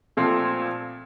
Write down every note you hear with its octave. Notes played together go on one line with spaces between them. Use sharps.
A#2 F3 A3 C4